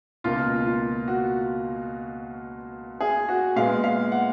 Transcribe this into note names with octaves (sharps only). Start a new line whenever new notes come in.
C#2 B2 A#3 F4
F4
F#4
G#4
F#4
A#2 G#3 B3 F5
F5
F#5